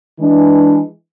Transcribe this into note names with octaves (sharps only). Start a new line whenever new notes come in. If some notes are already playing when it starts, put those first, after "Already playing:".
E3 G#3 D4